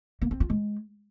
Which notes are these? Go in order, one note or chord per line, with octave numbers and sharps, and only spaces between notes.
A#3
C4
F4
G#3